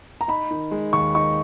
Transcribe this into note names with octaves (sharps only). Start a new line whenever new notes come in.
A#5
D#4 B5
D#3
G#3
D#2 C#6
D#4 C#6